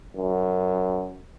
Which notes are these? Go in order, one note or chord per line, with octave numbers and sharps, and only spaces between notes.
F#2